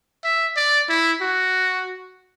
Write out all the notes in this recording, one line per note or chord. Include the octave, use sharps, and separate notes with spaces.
E5
D5
E4
F#4